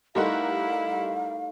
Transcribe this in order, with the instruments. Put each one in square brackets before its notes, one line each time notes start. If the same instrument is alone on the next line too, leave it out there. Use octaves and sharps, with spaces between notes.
[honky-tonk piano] G3 A#4 F#5 [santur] A3 D#4 C6 [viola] E4 [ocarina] F5